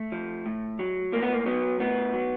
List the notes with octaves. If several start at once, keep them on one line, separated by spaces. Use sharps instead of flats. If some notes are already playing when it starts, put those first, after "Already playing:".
Already playing: A3
F3
A2
F#3
A2 A#3
B3
A#3
F#3 B3
A2 B3
F#3